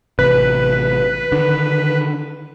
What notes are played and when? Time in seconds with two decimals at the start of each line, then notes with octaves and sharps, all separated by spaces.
0.19 A1 C3 B4
1.32 D3 D#3